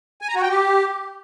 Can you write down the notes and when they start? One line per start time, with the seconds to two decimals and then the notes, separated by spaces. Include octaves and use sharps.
0.22 G#5
0.28 A#5
0.35 F#4
0.42 G5
0.49 G4